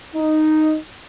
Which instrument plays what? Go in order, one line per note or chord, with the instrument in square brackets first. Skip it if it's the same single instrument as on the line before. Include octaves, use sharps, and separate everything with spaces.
[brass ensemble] D#4